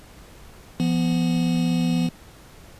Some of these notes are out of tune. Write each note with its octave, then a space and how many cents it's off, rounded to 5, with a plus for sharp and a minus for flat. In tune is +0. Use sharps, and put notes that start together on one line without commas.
F3 -40 B3 +0